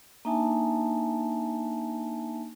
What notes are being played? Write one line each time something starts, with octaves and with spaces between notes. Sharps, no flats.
A#3 D4 D#4 E5 G#5 A5